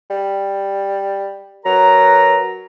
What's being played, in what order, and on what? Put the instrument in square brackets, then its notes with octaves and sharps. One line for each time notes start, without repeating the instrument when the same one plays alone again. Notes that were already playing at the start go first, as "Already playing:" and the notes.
[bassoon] G3
[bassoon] F#3 [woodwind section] A#4 B4 A#5